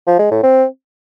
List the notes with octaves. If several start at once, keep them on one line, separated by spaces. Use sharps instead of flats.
F3
G#3
A2
C4